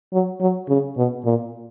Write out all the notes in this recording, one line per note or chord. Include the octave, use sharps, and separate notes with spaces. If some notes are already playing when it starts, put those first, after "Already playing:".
F#3
F#3
C#3
B2
A#2